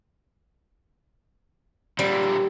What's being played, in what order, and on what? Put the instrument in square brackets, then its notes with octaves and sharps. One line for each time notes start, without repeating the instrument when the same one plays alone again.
[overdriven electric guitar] A#2 D3 [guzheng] G3